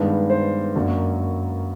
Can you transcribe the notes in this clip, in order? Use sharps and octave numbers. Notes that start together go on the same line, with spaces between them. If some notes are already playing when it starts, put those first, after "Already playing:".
Already playing: G2 D#3 G#3 B3
C5
F#2 D3 F#3 A#3